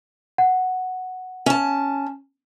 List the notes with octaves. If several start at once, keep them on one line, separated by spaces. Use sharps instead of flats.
F#5
C#4 A5